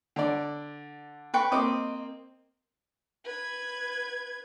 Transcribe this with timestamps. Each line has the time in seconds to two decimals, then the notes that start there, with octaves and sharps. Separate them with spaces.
0.16 D3 D5
1.34 B4 G5 C#6
1.52 A#3 C4 D#5 D6
3.24 B4 G#6